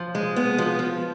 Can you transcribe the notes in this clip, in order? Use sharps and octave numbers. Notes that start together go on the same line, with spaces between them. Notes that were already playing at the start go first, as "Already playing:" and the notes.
Already playing: F3
G#3
B3
F3
F3